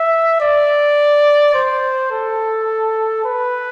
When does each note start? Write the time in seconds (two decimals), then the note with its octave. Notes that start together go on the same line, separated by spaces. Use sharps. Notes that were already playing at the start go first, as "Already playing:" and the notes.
Already playing: E5
0.41 D5
1.54 C5
2.12 A4
3.25 B4